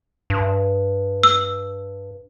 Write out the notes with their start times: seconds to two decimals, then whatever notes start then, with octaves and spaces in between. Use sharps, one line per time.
0.30 G2
1.23 E6